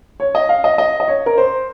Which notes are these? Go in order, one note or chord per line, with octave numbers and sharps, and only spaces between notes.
C#5
D#5
F5
D#5
D#5
D#5
C#5
A#4
C5